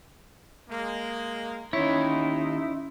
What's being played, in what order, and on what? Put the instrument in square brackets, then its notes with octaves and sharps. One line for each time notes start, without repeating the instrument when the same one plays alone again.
[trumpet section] G#3 A#3
[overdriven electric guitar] D#2 C#5 [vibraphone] C#4 C6 [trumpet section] D#4 [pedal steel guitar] E4